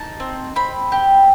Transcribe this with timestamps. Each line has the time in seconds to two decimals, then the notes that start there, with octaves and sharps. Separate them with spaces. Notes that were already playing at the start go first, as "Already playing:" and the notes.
Already playing: D#4 A5
0.20 C4
0.56 C4 B5
0.92 G4